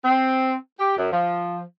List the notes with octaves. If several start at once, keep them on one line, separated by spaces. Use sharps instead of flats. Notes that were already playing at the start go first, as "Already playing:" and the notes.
C4
G4
F#2
F3